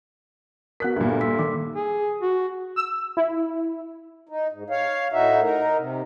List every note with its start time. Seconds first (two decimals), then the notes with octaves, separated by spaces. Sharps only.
0.80 B3 F#4 A#4 F#6 B6
0.96 D2 G2 A#2
1.09 A4
1.21 C6 E6 B6
1.39 D#3 D6
1.76 G#4
2.21 F#4
2.76 E6
3.17 E4
4.29 D#4
4.52 G#2
4.70 C#5 F5
5.12 A2 D#4 F#4 E5
5.41 D#4 A#4
5.78 C3